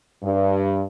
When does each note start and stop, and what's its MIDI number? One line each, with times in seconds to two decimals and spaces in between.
0.23 0.83 43